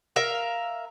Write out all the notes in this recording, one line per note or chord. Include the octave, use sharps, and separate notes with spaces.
A#4 E5 F5